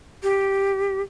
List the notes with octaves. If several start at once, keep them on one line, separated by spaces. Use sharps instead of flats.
G4